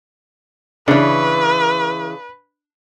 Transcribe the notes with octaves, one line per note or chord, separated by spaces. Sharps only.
C#3 E3 D4 B4